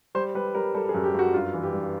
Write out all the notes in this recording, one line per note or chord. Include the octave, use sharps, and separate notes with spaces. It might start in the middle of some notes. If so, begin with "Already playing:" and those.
G3 C5
G3 B4
G3 A#4
G3 A4
G#4
F#2
G4
F#2 F#4
G2 F4
E3
G4
G2